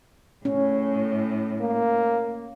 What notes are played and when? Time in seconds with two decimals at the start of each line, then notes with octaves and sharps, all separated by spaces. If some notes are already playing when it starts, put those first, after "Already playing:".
0.45 A2 C#4
1.60 A#3